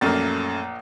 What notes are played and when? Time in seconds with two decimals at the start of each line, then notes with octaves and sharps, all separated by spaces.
0.01 A#1 F#2 A3 A#3 A6